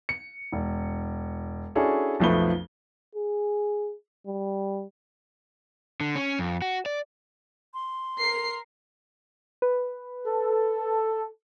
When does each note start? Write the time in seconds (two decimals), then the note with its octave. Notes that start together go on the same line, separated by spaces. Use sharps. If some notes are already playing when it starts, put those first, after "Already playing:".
0.09 C#7
0.52 E1
1.75 C#4 D4 E4 F#4 G#4 A4
2.20 B1 F2 F3 A3 B4 G7
3.15 G#4
4.27 G3
6.01 D3
6.16 C#4
6.39 F2
6.62 F#4
6.86 D5
7.74 C6
8.20 A#4 C7
9.62 B4
10.26 A4